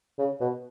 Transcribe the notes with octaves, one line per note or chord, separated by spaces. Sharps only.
C#3
B2